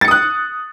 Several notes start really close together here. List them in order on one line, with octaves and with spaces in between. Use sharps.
A6 C#7 D#6 F#6